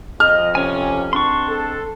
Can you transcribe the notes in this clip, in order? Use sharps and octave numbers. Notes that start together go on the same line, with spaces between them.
F2 D#5 F6
C3 C#4 C#5 G#5
G#2 C4 D4 C6 C#6
A4